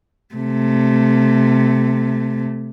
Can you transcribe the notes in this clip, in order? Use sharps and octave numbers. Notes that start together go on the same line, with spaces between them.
C3 A3